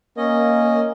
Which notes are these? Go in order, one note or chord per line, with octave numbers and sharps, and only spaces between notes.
A#3 C#4 D#5